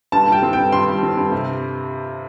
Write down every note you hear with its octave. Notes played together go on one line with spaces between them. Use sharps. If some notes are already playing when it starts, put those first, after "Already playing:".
G2 A5
G3
G5
C4
G2 G5
G2 C6
G3
C4
G2
C3